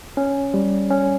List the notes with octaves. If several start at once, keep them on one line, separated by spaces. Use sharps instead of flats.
C#4
G3
C#4